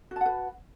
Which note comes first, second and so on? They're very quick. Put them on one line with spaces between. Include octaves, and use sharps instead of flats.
F#4 A5 F#5 B4